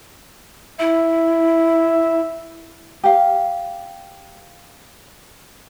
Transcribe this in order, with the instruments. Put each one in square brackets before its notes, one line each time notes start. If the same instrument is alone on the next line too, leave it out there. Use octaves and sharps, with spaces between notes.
[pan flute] E4 [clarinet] E5
[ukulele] G4 F5